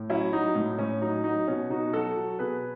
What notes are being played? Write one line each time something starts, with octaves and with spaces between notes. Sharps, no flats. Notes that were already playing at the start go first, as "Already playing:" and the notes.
Already playing: A2
F#3 C#4 E4
F#3 D#4
A2
A2 C#4
F#3 D#4
F#3 D#4
B2 C#4
B2 D#4 F#4
F#3 F#4 A4
F#3
B2 G#4 B4